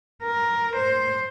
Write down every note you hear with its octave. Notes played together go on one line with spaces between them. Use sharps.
A#4
C5